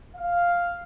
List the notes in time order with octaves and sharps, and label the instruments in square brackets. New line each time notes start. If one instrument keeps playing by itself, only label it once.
[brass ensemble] F5